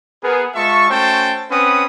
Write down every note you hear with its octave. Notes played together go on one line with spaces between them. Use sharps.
B3 G#4 A#4
G#3 F4 E5 A5 C#6
A3 C#4 F#4 C5 G5 A5
C4 C#4 B4 F#5 D#6